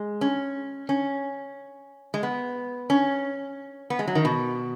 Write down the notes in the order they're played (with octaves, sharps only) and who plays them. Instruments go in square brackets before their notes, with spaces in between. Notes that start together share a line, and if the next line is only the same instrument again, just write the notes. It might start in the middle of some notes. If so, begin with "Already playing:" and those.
Already playing: [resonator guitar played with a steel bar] G#3
C#4
C#4
G#3
B3
C#4
B3
G#3
F#3
D#3
B2